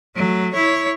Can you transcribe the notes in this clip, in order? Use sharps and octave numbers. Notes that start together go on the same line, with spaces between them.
F#3 A3
E4 C#5